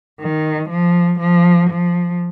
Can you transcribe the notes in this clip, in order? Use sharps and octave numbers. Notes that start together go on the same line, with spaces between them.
D#3
F3
F3
F3